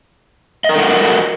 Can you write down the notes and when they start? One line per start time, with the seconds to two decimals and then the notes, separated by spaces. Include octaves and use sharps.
0.64 D#5
0.69 A#4
0.74 A4
0.79 F#5
0.84 F#4